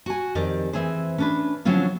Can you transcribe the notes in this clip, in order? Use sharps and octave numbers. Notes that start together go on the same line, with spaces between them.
F#4 G#5
F2 D#3 G4 A#4 D5
E3 C4 G#4 C5
C#4 D4 B4
D3 F3 F#3 C4 C#4 F4